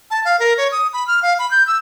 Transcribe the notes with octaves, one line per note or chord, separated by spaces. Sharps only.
A5
F5
A#4
C#5
D#6
B5
F6
F5
B5
G6
E6